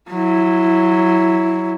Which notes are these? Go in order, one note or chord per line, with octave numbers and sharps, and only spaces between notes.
F#3 E4